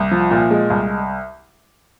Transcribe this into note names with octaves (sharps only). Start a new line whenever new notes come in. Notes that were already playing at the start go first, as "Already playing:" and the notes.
Already playing: C2
F3
A#2
G#3
C2